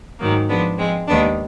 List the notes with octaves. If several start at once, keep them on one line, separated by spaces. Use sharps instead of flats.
G#2 D#3 F#3 A#3
F3 G#3 B3 D4
F3 G#3 C4
D#2 D#3 G#3 B3 D4